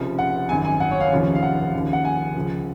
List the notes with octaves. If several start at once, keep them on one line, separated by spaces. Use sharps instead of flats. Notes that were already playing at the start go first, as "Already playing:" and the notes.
Already playing: F1 F2 C#3 F3
F#5
G#1 F#2 D#3 G#5
G#5
F#5
C#5
F5
F1 D#2 C#3 F3
F5
F#5
D#2 C#3 F3
F#5
G#5
C#2 C#3 F3